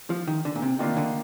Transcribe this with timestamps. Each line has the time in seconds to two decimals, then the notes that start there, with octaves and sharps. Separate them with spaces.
0.10 F3
0.27 D#3
0.45 D3
0.55 A#2
0.62 C3
0.79 D3 D#3 A#3 D4 F4
0.97 D3